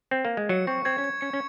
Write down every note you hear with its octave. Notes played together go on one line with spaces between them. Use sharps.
C4
A#3
G#3
F#3 C#7
C4 C#6
C4 G#6
C#4
G#6
C#4 C#7
C#4